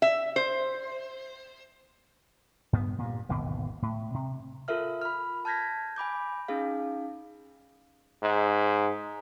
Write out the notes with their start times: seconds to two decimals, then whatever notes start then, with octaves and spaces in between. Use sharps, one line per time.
0.02 E5
0.36 C5
2.73 G2 B3
2.98 G2 A#2
3.29 D1 G#1 D#2 B2
3.82 A2
4.14 C3
4.68 F4 A4 A#4 E5 F6
5.01 B5 F6
5.45 A5 F6 G6 G#6 A#6 B6
5.96 G#5 B5 D6 G6
6.48 C#4 D#4 G#4 F5
8.23 G#2